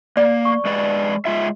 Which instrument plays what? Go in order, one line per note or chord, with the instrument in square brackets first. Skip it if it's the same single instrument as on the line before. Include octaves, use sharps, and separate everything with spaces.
[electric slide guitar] A#3 [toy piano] D5
[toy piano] C#6
[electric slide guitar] G#3 B4 D5
G#3 F4 E5